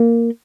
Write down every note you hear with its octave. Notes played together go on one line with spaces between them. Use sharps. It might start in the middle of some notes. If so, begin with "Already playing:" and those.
Already playing: A#3